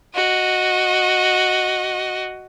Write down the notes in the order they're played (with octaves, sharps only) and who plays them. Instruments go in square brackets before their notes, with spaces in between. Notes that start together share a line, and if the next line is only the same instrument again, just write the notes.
[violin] F#4 D#5